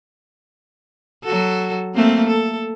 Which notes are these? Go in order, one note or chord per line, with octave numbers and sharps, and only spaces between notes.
F#3 F#4 A4
A3 A#3 C4
A4